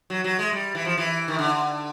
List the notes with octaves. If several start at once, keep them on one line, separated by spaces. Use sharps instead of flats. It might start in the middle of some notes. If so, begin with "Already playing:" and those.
F#3
F#3
G#3
G3
E3
F3
E3
D#3
D3